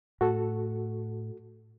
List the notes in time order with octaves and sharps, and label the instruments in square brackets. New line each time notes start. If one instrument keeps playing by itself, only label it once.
[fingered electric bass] A2 [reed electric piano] F#4 A4